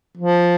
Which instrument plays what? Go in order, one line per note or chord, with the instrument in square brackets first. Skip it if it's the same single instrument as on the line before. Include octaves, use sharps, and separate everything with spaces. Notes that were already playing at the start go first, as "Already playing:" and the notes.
[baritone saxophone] F3